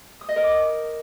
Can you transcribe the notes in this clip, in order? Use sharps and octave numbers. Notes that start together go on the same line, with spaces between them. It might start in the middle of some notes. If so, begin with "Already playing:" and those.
D#6
D#5
A#4
D6
D#6